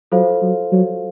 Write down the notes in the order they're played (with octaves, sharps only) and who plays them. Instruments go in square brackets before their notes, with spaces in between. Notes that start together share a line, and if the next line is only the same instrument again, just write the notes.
[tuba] F#3 [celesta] F4 A4 C5 F5
[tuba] F#3
F#3